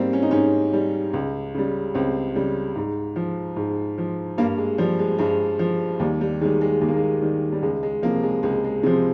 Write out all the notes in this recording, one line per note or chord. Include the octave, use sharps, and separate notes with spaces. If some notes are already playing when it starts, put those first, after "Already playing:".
Already playing: G#2 G3 A#3 C4
C#4
D#4
G#2 C#4
G3
C#2
C#3 G3
C#2 C4
C#3 G3
G#2
F3
G#2
F3
G2 A#3
G#3
F3 G3
G#3
G2 G#3
F3
D#2 G3
G3
D#3 G3 G#3
G#3
D#2 G#3
A#3
G#3
D#3 G3
G3
C#2 G#3
G#3
C3 F3 A#3
G#3
C#2 G#3
G#3
C3 F3 G#3